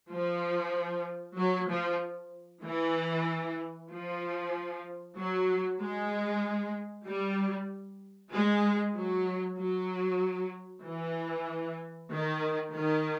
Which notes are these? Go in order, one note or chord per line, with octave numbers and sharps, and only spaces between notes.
F3
F#3
F3
E3
F3
F#3
G#3
G3
G#3
F#3
F#3
E3
D#3
D#3